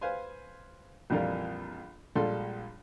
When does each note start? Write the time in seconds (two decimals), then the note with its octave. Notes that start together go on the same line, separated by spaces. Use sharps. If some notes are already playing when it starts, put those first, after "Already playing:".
0.01 B4 C5 F5 G#5 C6
1.10 A#1 F2 E3 G3 F4 A#4
2.15 A#1 G3 G#3 F4 A4 C6